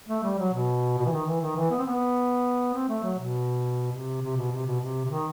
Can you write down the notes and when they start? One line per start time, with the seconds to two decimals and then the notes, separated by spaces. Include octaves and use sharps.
0.08 A3
0.23 G3
0.38 F#3
0.53 B2
0.98 B2
1.06 E3
1.12 D#3
1.26 E3
1.41 D#3
1.56 E3
1.71 B3
1.79 C4
1.85 B3
2.74 C4
2.89 A3
3.03 F#3
3.19 B2
3.92 C3
4.21 C3
4.37 B2
4.51 C3
4.66 B2
4.81 C3
5.05 C3
5.10 D#3